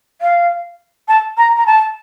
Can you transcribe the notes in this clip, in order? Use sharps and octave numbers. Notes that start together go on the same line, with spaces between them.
F5
A5
A#5
A#5
A5